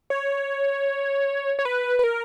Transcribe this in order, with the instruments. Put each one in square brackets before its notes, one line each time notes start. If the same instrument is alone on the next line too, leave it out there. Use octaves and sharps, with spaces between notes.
[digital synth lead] C#5
C#5
B4
B4
A#4